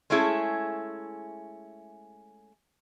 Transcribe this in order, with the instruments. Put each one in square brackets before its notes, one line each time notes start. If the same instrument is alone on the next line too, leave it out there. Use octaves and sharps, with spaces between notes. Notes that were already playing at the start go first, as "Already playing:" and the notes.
[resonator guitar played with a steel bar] G#3 A3 C#4 E4 G#4